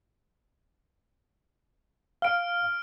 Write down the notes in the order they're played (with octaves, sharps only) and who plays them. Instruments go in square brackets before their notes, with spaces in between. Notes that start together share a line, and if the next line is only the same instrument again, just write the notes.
[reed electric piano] F5 [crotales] F6 D7